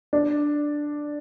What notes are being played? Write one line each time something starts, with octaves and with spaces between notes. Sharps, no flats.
D4